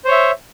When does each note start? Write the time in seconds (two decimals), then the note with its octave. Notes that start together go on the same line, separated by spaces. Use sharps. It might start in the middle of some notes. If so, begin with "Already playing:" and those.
0.05 C5
0.08 C#5
0.11 E5